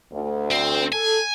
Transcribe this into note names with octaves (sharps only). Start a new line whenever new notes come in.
D2
C4
A4 G#5